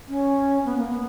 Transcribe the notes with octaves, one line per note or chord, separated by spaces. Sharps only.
C#4
B3
A#3
B3